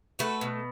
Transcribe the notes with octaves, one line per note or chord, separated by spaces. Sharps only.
A3 F#4 B4
B2